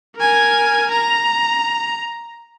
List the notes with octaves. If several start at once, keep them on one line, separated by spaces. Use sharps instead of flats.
A#4 G#5
A#5